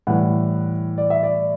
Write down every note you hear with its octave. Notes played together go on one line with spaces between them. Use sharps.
A2 E3 G3 F#5
D5
E5
D5